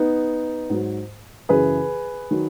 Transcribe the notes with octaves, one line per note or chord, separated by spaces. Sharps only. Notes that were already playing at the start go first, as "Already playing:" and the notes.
Already playing: B3 D#4
G#2 F#3
F#2 C#3 E3 G#4 B4
D#3 F#3